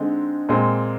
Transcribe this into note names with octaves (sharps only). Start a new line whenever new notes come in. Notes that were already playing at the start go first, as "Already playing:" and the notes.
Already playing: D3 G#3 C4 D#4
A#2 G#3 C4